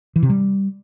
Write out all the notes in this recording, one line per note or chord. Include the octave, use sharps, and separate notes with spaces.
E3
C3
G3